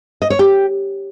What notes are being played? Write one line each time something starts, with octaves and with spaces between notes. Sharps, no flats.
D#5
C#5
G4